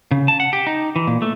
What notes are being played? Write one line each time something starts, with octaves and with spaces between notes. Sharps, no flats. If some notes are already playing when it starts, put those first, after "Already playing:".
C#3
A5
F#5
G4
D#4
E3
A#2
A3